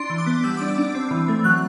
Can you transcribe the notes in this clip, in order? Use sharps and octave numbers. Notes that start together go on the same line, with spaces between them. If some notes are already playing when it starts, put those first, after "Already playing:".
Already playing: D4 C6
E3
D6
B3
G3 E6
D4 D6
E6
D4
C4
E3
A3
F#3 F#6